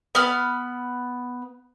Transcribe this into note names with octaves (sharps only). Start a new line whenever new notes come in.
B3 B5 F6